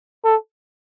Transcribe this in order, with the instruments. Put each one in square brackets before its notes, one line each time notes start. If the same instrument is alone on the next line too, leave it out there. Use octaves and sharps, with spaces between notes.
[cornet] A4